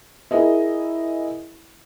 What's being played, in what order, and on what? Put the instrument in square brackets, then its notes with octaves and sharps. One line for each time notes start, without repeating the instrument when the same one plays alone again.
[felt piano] E4 G#4 A#4 D#5 E5